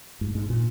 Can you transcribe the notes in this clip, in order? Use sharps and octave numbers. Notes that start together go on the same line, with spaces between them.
G#2
G#2
A#2